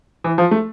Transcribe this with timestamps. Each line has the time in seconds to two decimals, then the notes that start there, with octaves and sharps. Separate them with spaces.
0.24 E3
0.38 F3
0.51 A3